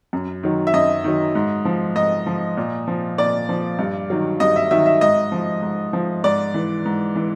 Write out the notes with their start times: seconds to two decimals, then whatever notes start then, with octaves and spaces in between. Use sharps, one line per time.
0.13 F#2
0.43 D#3 F#3
0.67 E5
0.73 F#2 D#5
1.04 D#3 F#3
1.35 G#2
1.65 F3
1.96 G#2 D#5
2.26 F3
2.57 A#2
2.87 F3
3.18 A#2 D5
3.49 F3
3.79 G2
4.10 D#3 F#3
4.40 G2 D#5
4.56 E5
4.71 D#3 F#3 E5
4.86 E5
5.01 G#2 D#5
5.32 F3
5.62 G#2
5.93 F3
6.24 G#2 D5
6.54 E3
6.85 G#2
7.15 E3